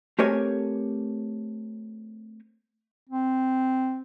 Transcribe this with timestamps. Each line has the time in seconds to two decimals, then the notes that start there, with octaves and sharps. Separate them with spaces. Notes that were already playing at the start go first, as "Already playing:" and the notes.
0.19 A3 C4 G4 A#4 C#5 G#5
3.10 C4